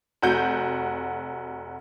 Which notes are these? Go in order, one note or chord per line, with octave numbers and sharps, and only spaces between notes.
F1 F#4 G6